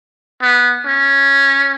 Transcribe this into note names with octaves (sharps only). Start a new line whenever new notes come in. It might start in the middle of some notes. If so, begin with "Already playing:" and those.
B3
C#4